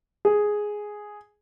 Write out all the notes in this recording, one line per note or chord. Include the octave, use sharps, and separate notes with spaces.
G#4